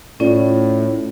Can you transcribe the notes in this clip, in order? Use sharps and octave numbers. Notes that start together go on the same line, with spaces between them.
A2 C#4 F4 D5